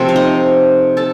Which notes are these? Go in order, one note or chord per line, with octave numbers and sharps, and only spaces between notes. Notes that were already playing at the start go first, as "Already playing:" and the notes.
Already playing: C3 F3 A3 C4 C5
F5
D#4 D#5
A4 A5